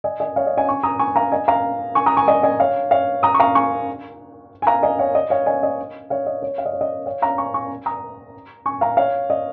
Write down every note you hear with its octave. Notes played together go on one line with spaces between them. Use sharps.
D#5 G#5
D#5 G#5
C#5 F5
D#5
D#5 G#5
G#5 C#6
A#5 D#6
G#5 C#6
F5 A#5
D#5 G#5
F5 A#5
G#5 C#6
A#5 D#6
G#5 C#6
D#5 G#5
D#5 G#5
C#5 F5
C#5 F5
A#5 D#6
C#6
F5 A#5
G#5 C#6
G#5
F5 A#5
D#5 G#5
C#5 F5
D#5
C#5 F5
D#5 G#5
D#5
C#5 F5
D#5
C#5
F5
D#5
C#5
D#5
C#5 F5
F5 A#5
G#5 C#6
G#5 C#6
A#5 D#6
G#5 C#6
F5 A#5
C#5 F5
D#5